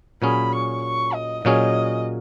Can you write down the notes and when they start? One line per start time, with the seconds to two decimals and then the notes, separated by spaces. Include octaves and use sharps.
0.22 A#2 F#3 C#4 G#4 B5
0.53 C#6
0.83 C#6
1.13 D#5
1.45 A#2 F#3 C#4 G#4 D#5